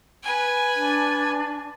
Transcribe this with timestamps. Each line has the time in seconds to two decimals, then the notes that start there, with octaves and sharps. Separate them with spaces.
0.23 B4 G#5
0.76 D4